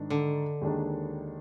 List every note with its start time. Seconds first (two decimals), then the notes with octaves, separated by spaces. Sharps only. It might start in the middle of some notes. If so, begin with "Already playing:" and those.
Already playing: G#2 D#3 D4
0.10 D3
0.61 D#2 D#3 G#3 D4